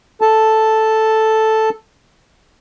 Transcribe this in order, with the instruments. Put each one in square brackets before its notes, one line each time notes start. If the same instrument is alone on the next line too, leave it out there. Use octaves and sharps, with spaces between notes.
[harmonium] A4 A5